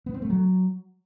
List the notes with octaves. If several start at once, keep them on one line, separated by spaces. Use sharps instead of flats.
B3
C4
A3
F#3